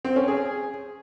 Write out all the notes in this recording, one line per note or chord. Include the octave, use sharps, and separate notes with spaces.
C4
C#4
G#4